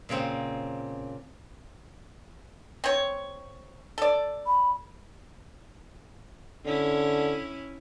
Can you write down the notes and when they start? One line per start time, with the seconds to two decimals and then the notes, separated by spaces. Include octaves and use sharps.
0.09 A#2 C#3 A#3 C4
2.84 C4 C#5
3.98 A4 D5
4.46 B5
6.66 D3 C#4 E4